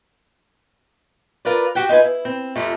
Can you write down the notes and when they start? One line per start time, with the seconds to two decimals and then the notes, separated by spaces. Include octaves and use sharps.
1.45 F4 A#4 B4 D5
1.75 F#4 G4 F#5 G5
1.89 D#4 F4 B4 G#5
2.02 E4
2.25 C4
2.56 F2 C3 A3 F4